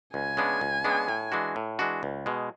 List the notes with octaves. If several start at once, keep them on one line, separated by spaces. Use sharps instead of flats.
C#2 G#5
C#3 G#3 B3 D4
C#2
C#3 G#3 B3 D4
A2
E3 G#3 D4 F#4
A2
E3 G#3 D4 F#4
C#2
B2 G#3